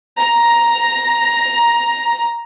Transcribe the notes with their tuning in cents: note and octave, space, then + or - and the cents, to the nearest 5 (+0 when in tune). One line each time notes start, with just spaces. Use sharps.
A#5 +10